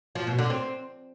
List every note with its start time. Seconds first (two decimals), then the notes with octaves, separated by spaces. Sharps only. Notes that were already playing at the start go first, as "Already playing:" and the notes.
0.15 F3
0.27 B2
0.38 D3
0.50 C4